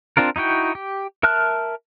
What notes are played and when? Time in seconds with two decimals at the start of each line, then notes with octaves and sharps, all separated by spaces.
0.17 C4 D4 F4 A#4
0.36 D#4 E4 F#4 G5
0.75 G4
1.23 A#4 E5 A5 F6 F#6